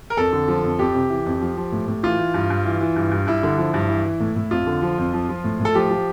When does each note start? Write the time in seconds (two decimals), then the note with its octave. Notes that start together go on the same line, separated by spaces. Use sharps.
0.10 A#4
0.17 F2 A4
0.33 D3
0.48 F3
0.64 F2
0.79 F2 G4
0.95 C3
1.10 E3
1.26 F2
1.41 F3
1.57 F3
1.72 A2
1.88 A2
2.03 E3 F4
2.19 E3
2.34 G2
2.50 G2
2.65 E3
2.81 E3
2.96 G2
3.11 G2
3.27 G2 E4
3.43 D3
3.58 F3
3.74 G2
3.89 E3
4.05 E3
4.20 A2
4.36 A2
4.51 F2 F4
4.67 D3
4.82 F3
4.98 F2
5.13 F3
5.29 F3
5.44 A2
5.60 A2
5.65 A4
5.75 F3 G4
5.90 F3